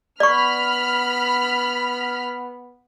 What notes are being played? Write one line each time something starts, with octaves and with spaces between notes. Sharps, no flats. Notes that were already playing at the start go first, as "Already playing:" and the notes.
B3 D5 B5 C#6 F6